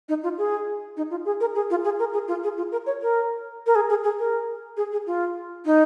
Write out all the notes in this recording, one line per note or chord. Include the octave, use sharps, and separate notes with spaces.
D#4
F4
G#4
D#4
F4
G#4
A#4
G#4
F4
G#4
A#4
G#4
F4
G#4
F4
A#4
C#5
A#4
A#4
G#4
G#4
G#4
A#4
G#4
G#4
F4
D#4